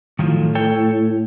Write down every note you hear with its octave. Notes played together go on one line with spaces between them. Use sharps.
A2 D#3 F3 F#3
A4 C#5 G5